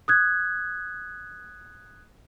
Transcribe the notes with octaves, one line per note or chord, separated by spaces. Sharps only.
D#6 F#6 G#6